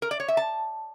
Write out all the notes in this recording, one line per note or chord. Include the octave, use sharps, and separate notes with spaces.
A#4
D5
C#5
E5
A5